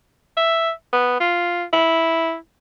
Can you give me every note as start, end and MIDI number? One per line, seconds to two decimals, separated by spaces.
0.37 0.71 76
0.93 1.16 59
1.20 1.64 65
1.73 2.36 64